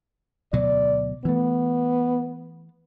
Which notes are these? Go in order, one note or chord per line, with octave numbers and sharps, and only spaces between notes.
D2 B2 F#3 D5
E3 A3 B3